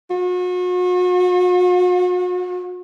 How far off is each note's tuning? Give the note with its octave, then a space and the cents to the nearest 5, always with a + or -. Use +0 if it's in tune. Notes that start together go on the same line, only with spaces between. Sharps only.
F#4 -40